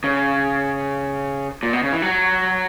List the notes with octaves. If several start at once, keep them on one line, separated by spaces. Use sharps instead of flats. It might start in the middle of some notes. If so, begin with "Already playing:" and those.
C#3
A#2
B2
C#3
E3
F#3